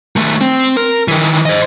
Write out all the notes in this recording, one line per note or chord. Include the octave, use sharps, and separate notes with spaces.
D#3 A3
C4
A#4
D#3 E3
C5 D#5